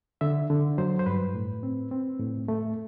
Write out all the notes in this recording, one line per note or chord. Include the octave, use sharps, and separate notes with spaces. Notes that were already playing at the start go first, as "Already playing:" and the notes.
D3 E5
D3
F#3 C5
C5
G2 B4
A2
C4
C4
A2
A3